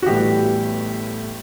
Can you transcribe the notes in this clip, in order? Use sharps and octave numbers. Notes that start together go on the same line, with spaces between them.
F#4
A1 A2 G3 B3 G4